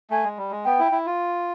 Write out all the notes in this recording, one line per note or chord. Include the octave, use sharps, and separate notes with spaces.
A3 G#5
G#3
G3
G#3
B3 G5
E4
E4
F4